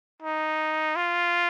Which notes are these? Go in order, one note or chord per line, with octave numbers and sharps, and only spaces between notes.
D#4
F4